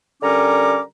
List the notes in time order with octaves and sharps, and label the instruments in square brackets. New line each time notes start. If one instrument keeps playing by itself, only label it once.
[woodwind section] D3 G3 C#4 A#4 A#5 D6